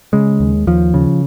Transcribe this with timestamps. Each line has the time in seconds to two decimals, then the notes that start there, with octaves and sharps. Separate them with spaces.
0.13 C#3 G#3
0.40 D#2
0.67 D#2 F3
0.94 C#3